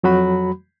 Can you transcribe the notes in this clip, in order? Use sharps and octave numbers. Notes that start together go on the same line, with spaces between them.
F2 F#3 F#4 B5